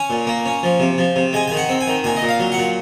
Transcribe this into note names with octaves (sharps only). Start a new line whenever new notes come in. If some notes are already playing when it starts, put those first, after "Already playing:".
Already playing: C#4 G#5
A#2
A#3
C#4
F3
C3
F3
C3
G#3 G#5
D#3 G#5
F#5
C4
G#5
D#3
A#2 G#5
D#5
A#2
F5
F#3
F#5
A#2